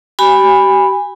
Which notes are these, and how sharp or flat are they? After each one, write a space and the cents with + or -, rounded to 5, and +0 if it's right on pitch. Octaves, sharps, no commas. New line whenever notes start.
G4 -40 G#5 -25 B5 +0